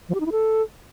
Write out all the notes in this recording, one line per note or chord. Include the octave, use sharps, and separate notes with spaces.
F3
G4
D#4
E4
A4